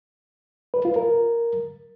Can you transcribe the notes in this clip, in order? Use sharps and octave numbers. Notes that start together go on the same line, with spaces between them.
B4
F4
A#4